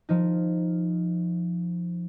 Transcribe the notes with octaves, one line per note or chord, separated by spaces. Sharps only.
F3 D#4